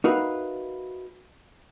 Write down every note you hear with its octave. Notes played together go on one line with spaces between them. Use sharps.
D#4 F#4 A#4 B4 E5 F5